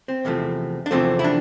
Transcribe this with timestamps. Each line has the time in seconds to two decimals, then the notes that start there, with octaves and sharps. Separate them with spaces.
0.08 C4
0.25 E2 C3 F3 A3
0.86 D4
0.91 E2 C3 F3 A3 C4
1.19 E4
1.24 D4